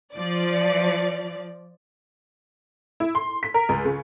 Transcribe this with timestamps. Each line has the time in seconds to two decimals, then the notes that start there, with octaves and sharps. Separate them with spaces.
0.13 F3 D5
3.00 E4
3.15 C6
3.43 B6
3.54 A#4
3.69 C#2
3.85 C#3